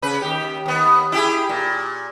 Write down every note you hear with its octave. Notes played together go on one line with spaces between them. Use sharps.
C#3 B4
D#2 G4
D#2 B3
E4 G4 G#4
A#2